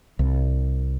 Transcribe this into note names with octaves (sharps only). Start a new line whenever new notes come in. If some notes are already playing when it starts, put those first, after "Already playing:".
C2